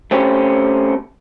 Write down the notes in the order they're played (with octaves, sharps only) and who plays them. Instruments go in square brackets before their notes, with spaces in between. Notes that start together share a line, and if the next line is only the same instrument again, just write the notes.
[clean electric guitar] A3 C4 C#4 G4